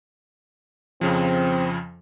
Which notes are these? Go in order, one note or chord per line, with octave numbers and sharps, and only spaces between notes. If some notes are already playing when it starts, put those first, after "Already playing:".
F2 C#3 F3 C4